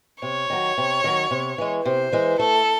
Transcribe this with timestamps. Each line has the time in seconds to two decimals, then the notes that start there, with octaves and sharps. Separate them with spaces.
0.22 C3 C#5
0.50 D#3 F#3
0.78 C3
1.04 D#3 F#3
1.31 C3
1.58 E3 G#3
1.85 C3 C5
2.12 E3 G#3
2.39 A3 A4